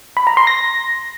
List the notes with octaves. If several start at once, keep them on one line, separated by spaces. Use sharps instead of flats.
B5
A#5
C6
A#6